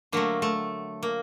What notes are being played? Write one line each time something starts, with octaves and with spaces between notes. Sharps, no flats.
D3 F#3 A3 A#3
A3
A#3